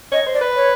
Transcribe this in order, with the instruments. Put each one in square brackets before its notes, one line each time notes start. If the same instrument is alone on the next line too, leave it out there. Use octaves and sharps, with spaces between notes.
[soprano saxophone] C#5 [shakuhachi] D#5
[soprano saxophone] C5
[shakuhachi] D5
[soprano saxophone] B4
[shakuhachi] C#5